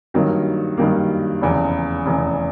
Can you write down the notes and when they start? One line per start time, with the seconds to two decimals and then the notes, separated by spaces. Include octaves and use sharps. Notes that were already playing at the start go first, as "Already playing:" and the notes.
0.14 G2 D#3 F#3 A#3
0.77 G2 D#3 F#3 A#3
1.41 F1 E2 C#3
2.06 F1 E2 C#3